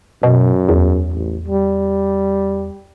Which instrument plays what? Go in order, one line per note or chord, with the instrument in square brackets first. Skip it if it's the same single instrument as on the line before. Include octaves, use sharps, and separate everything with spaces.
[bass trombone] F#2 [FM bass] B2
[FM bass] E2
[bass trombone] A1
G3